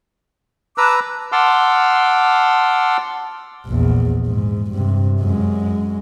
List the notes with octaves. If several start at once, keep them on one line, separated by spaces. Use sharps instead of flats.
B4 A5 A#5 D6 E6 F#6
F#5 A5 C6 D6 E6 F6
A#1 E2
G#2
G2 C3
F#2 G#3